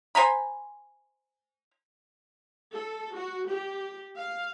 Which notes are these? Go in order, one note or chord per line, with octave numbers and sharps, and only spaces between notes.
C5 G#5 A#5 B5
A4
F#4
G4
F5